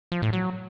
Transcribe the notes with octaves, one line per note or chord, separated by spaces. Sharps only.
F3
A2
F#3